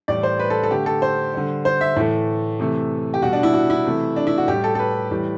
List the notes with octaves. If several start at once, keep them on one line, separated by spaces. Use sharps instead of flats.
A2 E3 G3 D5
C5
B4
A4
A4
D3 A3 G4
A4
C5
D3 G3
C5
E5
A2 E3 A3
C3 E3 A3
G4
B2 G3 F#4
D4
E4
F#4
E4
C3 E3 A3
D4
E4
F#4
A2 G3 G4
A4
A4
B4
A2 E3 G3